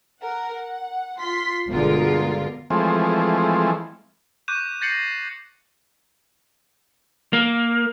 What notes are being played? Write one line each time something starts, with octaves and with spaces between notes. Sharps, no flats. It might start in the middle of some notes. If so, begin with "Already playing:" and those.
A#4 F#5
F#5
F4 C6 B6
G1 B2 D3 G#3 F4 A#4
E3 F3 G#3 A3 C4
C#6 D6 F#6 G6 D#7 E7
G6 A6 A#6 C7 C#7 F#7
A#3